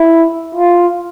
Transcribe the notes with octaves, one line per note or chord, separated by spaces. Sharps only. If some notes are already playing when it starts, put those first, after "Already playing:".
Already playing: E4
F4